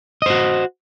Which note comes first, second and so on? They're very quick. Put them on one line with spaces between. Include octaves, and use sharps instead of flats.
D#5 C5 F#4